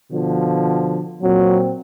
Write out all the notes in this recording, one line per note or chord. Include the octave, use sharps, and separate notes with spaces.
B2 D3 F3
A#2 F#3 C4